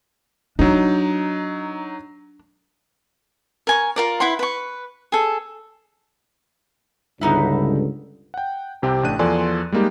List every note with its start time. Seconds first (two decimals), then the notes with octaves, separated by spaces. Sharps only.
0.59 F#3 D4 D#4
3.67 A#4 G#5 C#6
3.96 F4 A#4 D5
4.20 E4 B4 F#5 C6
4.39 B4 C#6
5.12 G#4 A4
7.21 C#2 G2 D3 B3 D#4 E4
8.34 F#5 G5
8.82 C2 C3 C4 G4
9.03 A1 A3 D4 G5 F#6 D#7
9.19 E2 F3 A4 D5 G#5 C6
9.72 G3 G#3 A#3 D#4 G4